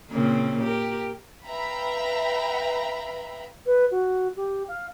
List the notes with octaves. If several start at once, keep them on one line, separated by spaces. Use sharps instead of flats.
A#2 C#3 C4
G4 A#4
B4 E5 F5 G5 A#5 B5
B4
F#4
G4
F5